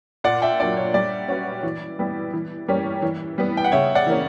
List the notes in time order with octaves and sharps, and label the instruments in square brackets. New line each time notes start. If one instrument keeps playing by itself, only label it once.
[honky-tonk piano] A#2 [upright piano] D5 F#5
[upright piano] E5 G5
[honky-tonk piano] F#3 A#3 D4 [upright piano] D5
[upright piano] C#5
[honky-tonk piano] G3 [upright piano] D5
[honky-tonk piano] C#4 F#4 B4
E3
G3 B3 E4 G4
E3
G3 A#3 C#4 G4
E3
G3 B3
[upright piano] G5
F#5
[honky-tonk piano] C#3 [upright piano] C#5 E5
[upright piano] D5 F#5
[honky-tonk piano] E3 A#3 C#4